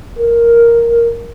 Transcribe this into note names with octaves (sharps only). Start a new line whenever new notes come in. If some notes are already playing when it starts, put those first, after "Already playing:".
A#4